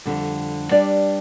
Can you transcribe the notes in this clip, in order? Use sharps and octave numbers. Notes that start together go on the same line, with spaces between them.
F2 D3 G3
G3 D4 G4 B4 D5